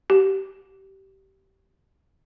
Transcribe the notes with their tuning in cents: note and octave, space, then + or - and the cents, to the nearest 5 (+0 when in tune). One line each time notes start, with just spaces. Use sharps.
G4 -20